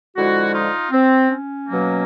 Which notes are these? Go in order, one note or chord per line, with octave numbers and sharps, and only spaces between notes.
D3 F3 G#3 E4 F#4
D#4 F4
C4
C#4
B2 F#3 A#3